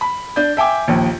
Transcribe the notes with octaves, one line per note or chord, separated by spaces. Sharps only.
B5
D4 G6
E5 G5 G#5 D6
A#1 D#2